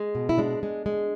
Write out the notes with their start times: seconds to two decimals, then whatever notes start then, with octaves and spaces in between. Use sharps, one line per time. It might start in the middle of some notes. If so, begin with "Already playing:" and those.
Already playing: G#3
0.15 B2
0.29 E4
0.38 G#3 D4
0.63 G#3
0.86 G#3